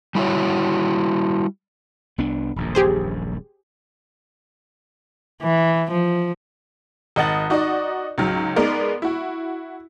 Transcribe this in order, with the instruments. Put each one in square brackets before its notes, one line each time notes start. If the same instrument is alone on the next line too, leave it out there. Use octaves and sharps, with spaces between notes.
[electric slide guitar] G3 E4 F#4 C#5
[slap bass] C2 B3 D4
D#1 A#1 F#2
[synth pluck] G4 G#4 C5
[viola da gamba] E3
F3
[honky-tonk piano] G#1 D#5 F#5 A6 F#7
D#4 F#4 D5 D#5
C#2 G#2 F#3 F6
G#3 B3 D#4 A#4 D5
E4 F#4